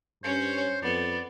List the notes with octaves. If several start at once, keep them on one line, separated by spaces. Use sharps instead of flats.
G2 C#4 C5 C#5
F2 B3 D5